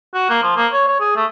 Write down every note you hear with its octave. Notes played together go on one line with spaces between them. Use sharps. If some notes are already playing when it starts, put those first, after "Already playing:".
F#4
A#3
F3
A#3
C#5
C#5
G#4
A3